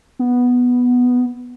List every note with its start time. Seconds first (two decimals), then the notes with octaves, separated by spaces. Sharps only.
0.19 B3